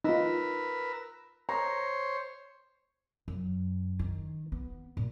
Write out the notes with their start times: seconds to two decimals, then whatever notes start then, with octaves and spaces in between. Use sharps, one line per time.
0.05 D#4 F4 A#4 B4 E6
1.49 C5 C#5 A#5
3.28 F#2
3.99 D#3
4.52 B3
4.97 A#2